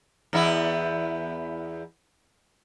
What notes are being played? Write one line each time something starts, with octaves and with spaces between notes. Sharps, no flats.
E2 B3 E4